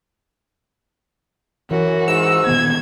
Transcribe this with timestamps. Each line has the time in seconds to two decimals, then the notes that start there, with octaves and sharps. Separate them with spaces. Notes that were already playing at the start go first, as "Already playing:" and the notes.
1.71 F#2 E3 F#4
2.07 G#2 E6
2.47 A#2 D#3 B3 G#6